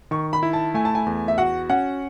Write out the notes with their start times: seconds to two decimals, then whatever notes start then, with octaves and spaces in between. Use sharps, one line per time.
0.11 D#3 C#6
0.33 B5
0.43 E4
0.53 A5
0.74 A3 G#5
0.85 A5
0.95 G#5
1.06 E2
1.28 E5
1.38 F#4 F#5
1.69 C#4 F#5